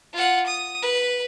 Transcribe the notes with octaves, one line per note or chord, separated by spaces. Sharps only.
F4 F#5
D#6
B4